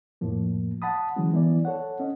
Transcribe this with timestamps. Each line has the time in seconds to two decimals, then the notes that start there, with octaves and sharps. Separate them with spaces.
0.21 F2 A2 F3 A#3
0.82 F#5 A5 B5 D#6
1.16 D3 E3 F#3 G#3 C#4
1.33 E3 B3 E4 D5
1.65 A4 C#5 F#5
2.00 C#4 D#5